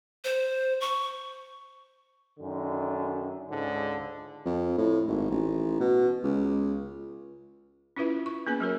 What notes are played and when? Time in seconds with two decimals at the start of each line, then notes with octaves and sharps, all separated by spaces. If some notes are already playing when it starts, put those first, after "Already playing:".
0.24 C5
0.81 C#6
2.39 F#2 D3 D#3
3.49 C#2 G#2 D3
4.45 F2
4.78 A2
5.08 G#1
5.30 A1
5.80 B2
6.23 C#2
7.96 C#4 E4 F4 B4 E5
8.26 C#6
8.47 A#3 B3 C#4 G#4 B4 G#5
8.60 F#3 F#4 A#4 C#5